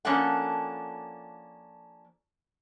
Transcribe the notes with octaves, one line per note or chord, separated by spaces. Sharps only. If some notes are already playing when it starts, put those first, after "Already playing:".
F3 A#3 C#4 D4 A4 F#5